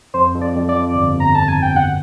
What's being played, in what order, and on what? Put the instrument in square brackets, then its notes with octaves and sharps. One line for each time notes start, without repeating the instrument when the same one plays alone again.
[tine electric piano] F2 [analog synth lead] C5
[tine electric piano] F2
[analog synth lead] D5
[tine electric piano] F2
[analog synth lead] D5
[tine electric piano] F2
G1
G1
[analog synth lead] A#5
[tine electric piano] F2 [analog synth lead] A5
[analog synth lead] G#5
[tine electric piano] G1
[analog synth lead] G5
[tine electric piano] B2 [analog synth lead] F#5